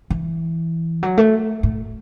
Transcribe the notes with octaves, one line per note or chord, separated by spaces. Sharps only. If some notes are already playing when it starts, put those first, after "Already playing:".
E3
F#3
A3
A2